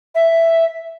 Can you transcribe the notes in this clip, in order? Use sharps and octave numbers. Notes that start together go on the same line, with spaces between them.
E5